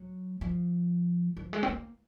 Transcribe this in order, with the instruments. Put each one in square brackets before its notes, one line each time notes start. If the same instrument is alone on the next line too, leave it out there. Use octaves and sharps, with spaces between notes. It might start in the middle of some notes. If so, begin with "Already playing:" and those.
Already playing: [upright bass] F#3
F3
F3
G#3
C4
A#3